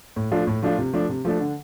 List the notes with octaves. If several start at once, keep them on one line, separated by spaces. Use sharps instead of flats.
A2
F3 A3 D4 F4
A2
F3 A3 D4 F4
C3
F3 A3 D4
C3
F3 A3 D4
D3